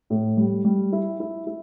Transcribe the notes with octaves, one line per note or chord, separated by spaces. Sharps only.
A2
G3
G3
E4
E4
E4